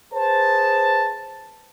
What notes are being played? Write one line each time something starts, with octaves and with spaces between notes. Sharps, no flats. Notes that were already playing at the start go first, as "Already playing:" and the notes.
G#4 B4 C5 A5